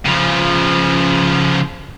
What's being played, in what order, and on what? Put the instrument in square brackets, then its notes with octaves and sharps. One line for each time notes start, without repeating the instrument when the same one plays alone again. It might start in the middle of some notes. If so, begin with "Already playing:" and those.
[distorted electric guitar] C#3 F3